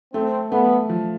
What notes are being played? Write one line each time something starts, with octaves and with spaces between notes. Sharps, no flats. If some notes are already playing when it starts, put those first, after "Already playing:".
A3 C4
A3 B3
F3